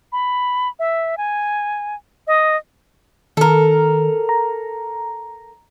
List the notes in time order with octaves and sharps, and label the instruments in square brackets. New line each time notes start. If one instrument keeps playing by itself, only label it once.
[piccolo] B5
E5
G#5
D#5
[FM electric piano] D#3 [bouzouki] A4 A#4
[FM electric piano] A#5